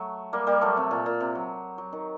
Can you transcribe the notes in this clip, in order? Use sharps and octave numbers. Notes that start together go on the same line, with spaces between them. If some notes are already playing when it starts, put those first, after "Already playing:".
Already playing: F#3 A3
G3 A#3
G3 A#3
F#3 A3
C3
A#2
A#2
C3
F#3
F#3
D#3